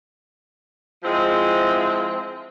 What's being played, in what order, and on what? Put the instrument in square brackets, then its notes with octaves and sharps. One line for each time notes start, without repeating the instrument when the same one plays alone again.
[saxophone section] F3 G#3 C4 E4